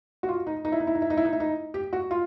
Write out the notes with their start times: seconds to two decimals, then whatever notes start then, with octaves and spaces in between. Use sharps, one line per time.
0.23 F#4
0.28 F4
0.47 D#4
0.65 D#4
0.72 E4
0.80 D#4
0.87 E4
0.95 D#4
1.02 E4
1.10 D#4
1.17 E4
1.25 D#4
1.33 E4
1.40 D#4
1.74 G4
1.93 F#4
2.11 F4